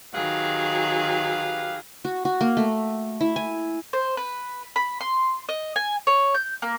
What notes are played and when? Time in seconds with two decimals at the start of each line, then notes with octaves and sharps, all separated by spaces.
0.14 D#3 F#3 G4 G#4 B4 F5
2.05 F#4
2.25 F#4
2.41 A#3
2.57 A3
3.21 E4
3.36 G#5
3.93 C5
4.17 B4
4.76 B5
5.01 C6
5.49 D#5
5.76 G#5
6.07 C#5
6.34 G6
6.62 A#3